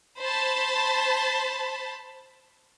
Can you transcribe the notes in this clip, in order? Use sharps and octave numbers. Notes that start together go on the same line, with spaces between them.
C5 A5 B5